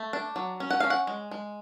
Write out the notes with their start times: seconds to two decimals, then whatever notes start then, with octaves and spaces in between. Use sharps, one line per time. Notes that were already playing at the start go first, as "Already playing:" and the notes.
Already playing: A3
0.13 D4
0.36 F#3
0.60 C#4
0.70 F#5
0.80 C#4 F5
0.90 F#5
1.07 G#3
1.31 G#3